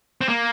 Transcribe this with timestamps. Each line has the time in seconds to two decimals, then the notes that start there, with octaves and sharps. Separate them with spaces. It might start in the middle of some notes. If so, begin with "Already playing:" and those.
0.21 C4
0.29 A#3